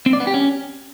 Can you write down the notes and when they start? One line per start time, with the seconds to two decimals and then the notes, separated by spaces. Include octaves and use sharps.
0.06 C4
0.13 D5
0.20 B3
0.27 G4
0.34 C#4